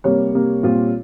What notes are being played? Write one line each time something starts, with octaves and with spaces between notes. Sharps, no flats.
C3 G3 A#3 C#5
C3 G3 A#3
A#2 G3 C4 F4